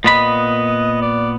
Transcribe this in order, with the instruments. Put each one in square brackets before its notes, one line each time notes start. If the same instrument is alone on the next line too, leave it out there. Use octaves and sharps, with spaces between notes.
[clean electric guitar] A#2 B3 B5 [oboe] D#5
[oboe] D5